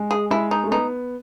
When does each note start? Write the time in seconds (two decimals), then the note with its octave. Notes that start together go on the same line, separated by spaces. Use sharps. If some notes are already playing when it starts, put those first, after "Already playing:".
Already playing: G#3
0.11 G#4
0.30 G#3 E4
0.51 D#4
0.64 A3
0.71 B3 D#4